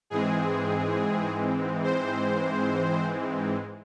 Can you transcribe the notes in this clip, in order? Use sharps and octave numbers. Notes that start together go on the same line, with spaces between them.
G#2 E3 G#3 C4 G#4
C5